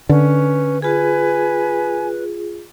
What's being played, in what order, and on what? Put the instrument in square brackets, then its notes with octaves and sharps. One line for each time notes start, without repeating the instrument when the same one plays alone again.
[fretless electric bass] D3 [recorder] C#4 [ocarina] B4
[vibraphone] F4 G#4 [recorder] B4 [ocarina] G#5